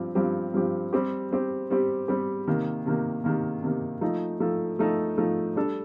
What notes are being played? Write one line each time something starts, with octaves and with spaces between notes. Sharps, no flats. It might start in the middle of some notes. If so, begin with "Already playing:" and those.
Already playing: G2 F3 C4 G4
G2 F3 C4 G4
G2 F3 C4 G4
G3 C4 G4
G3 C4 G4
G3 C4 G4
G3 C4 G4
C3 D#3 A#3
C3 D#3 A#3
C3 D#3 A#3
C3 D#3 A#3
F3 A3 D#4 A4
F3 A3 D#4 A4
F3 A3 D#4 A4
F3 A3 D#4 A4
G3 D4 A4